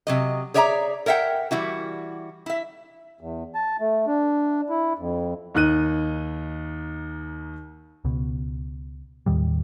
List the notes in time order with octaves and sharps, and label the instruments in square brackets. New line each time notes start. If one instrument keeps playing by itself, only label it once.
[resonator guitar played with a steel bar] C3 F#3 D#5
G#4 C#5 D5 E5 G#5 A#5
A#4 C#5 E5 F#5 G5
E3 G3 E4 F#4
E4 E5
[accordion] E2
A5
A3
D4
E4
F2
[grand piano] D#2 D#4 F#6 D#7
[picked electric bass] C#2 B2
D#2 A2 D#3 G3